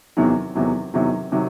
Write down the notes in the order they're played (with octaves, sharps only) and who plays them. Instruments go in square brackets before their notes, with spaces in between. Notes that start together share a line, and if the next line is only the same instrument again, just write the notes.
[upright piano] E2 C3 D#3 F#3
E2 C3 D#3 F#3
E2 C3 D#3 F#3
C3 D#3 F#3